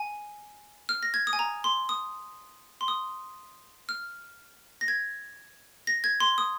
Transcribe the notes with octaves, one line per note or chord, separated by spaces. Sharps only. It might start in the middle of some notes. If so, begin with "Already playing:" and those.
Already playing: G#5
F6
A#6
G#6
D#6
G#5
A#5
C6
D#6
C6
D#6
F6
A#6
G#6
A#6
G#6
C6
D#6